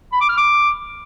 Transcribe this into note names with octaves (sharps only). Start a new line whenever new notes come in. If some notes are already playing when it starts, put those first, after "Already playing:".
B5
D6
F6
D6